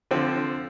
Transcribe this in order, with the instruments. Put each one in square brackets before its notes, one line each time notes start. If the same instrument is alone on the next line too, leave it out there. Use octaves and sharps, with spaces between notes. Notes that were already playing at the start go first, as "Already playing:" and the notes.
[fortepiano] D3 F3 C4